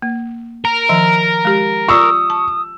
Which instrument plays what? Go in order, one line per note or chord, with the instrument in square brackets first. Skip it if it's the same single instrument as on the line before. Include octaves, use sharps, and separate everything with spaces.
[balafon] A#3
[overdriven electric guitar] A#4
[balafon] D#3 F3 E5
G#3 G4
[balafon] F4 D5 [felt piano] C#6 E6 [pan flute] D#6
[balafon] A5